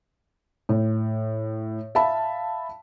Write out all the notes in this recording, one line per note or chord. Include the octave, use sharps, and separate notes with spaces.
A2
E5 F5 A5 B5